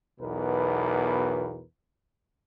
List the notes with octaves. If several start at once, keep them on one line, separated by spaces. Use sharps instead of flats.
B1 E2 B2 A#4 B4